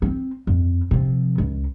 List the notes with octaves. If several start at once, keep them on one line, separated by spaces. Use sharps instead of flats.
B3 C4
F2
C3 F3
C#2